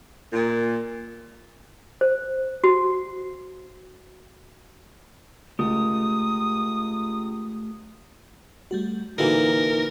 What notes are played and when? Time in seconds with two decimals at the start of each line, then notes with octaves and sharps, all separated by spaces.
0.33 A#2
2.01 C5
2.64 F#4
5.59 C#2 A3 G4 A#4 D#6
8.71 G3 A3 F#4
9.18 A#2 D3 E3 D#4 F#4 A4 A#4